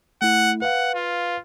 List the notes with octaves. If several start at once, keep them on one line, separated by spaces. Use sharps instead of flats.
A3 E4 F#5
B4 F5 F#5
F4